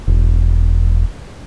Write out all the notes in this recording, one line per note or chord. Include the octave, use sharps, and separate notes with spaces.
E1